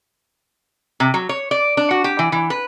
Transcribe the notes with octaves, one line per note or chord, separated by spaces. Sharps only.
C3
F#3
C#5
D5
D4
F#4
G4
E3
E3
B4